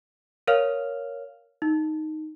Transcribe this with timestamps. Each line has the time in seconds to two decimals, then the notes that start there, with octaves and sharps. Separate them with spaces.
0.48 A#4 C#5 F5 F6 F7
1.62 D#4